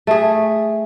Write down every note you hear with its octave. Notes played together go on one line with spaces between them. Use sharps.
A3 G#4